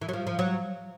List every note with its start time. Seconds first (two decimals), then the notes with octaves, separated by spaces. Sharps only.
0.02 E3
0.09 F#3
0.13 F3
0.27 F3
0.39 F#3